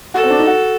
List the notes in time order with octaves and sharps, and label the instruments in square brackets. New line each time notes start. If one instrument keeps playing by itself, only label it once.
[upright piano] F#4 [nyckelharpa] A4
[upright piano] C4
D4
D#4
F#4